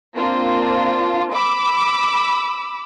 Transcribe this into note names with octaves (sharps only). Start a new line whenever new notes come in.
A#3 C4 D4 F4
B5 D6 E6